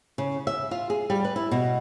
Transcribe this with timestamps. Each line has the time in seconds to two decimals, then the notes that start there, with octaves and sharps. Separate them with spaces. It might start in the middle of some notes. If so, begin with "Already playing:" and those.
0.18 C#3
0.47 E5
0.71 F4
0.90 G#4
1.10 G3
1.25 B4
1.36 E4
1.51 B2